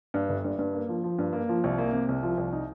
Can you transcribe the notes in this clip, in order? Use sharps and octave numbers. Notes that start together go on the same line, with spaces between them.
G2
G1
G2
G2
A#3
F3
F3
G2
A#3
F3
C2
A#3
C3
C2
F3
C2
D#4